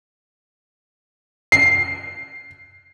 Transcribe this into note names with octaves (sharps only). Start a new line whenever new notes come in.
C7